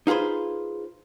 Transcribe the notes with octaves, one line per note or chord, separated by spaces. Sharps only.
D#4 F4 G#4 B4 C5